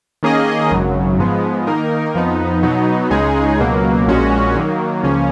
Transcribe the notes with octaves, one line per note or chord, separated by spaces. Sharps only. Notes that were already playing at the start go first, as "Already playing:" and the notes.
D#3 A#3 C#4 G#4 D#5
G#1 F#2 C#3 F#3
G#2 F3 G#3 B3
D#3 A#3 D#4 A#4
F2 F3 B3 D#4
B2 F#3 B3 D#4
C#2 C#3 G#3 D#4 G#4
C#2 B2 F#3 A#3
A#1 A#2 G#3 C#4 F#4
D#3 F#3 A#3
C#2 C#3 F3 A#3 C#4